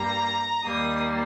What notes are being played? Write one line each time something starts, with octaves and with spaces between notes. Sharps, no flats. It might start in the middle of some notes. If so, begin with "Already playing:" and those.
Already playing: G2 G3 A#3 A#5
D#2 D#3 G3 A#3 D#6